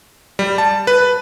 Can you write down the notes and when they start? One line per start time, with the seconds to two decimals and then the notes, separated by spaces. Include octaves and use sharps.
0.39 G3
0.58 A5
0.87 B4